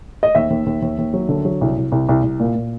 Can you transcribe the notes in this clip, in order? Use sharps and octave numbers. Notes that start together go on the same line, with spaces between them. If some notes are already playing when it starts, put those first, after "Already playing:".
D#5
D#2 E5
D#2
D#2
D#2
D#2
F#3
D3
F#3
C2
C2
C2
C2
C2
A#2
A#2